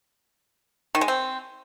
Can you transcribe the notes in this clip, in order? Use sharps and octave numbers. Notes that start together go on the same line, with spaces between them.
D#3
G#3
C4